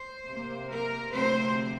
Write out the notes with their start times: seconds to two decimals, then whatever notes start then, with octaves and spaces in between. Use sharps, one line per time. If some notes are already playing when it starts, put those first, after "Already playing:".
Already playing: C5
0.28 C3 A#3
0.69 A#4
1.11 D2 C3 F3 C4 C5